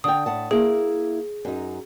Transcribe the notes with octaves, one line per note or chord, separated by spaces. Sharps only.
D3 G5 D#6
A2 F#5 A5
A#3 E4 G#4
F#2 D#4